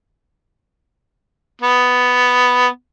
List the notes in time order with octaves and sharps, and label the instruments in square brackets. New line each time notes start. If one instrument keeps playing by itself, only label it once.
[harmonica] B3